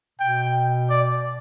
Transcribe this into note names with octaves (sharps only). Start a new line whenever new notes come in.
B2 G5
D5